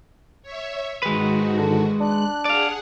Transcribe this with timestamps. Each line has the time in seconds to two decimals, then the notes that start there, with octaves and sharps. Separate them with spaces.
0.43 C#5 E5
1.03 G#2 D#3 G#3 F#4 B4
1.57 D3
2.00 D4 F#6
2.45 G#4 D5 F5 F#5